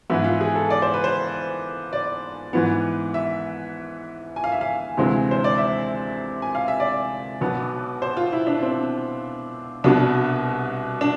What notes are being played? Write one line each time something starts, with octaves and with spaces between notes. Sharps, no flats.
G#2 E3 B3 E4
F4
G#4
A4
D5
C5
B4
C5
D5
G#2 E3 B3
E5
G#5
F5
E5
F5
D2 C3 E3 G#3 C4
C5
D5
E5
G#5
F5
E5
D5
B1 B2 B3
C5
F4
E4
D4
C4
C2 B2 B3 D4
D4